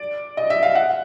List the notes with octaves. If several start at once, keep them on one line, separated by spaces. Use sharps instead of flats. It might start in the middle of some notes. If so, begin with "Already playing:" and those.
Already playing: D5
D#5
E5
F5
F#5